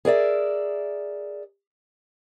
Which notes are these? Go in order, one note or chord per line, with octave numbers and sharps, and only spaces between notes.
G#4 A#4 D5 E5